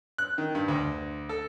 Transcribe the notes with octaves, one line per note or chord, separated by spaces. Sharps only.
F#6
D#3
G2
D2
A4